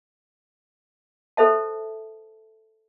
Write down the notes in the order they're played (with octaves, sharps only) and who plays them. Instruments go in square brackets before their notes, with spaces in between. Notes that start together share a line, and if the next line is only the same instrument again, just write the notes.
[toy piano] A4 C5 E5 A5